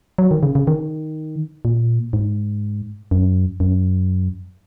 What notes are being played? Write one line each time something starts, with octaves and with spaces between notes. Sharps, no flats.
F#3
D#3
C#3
C#3
D#3
A#2
G#2
F#2
F#2